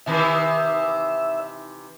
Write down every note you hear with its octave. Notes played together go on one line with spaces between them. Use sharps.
C3 D#3 E3 E5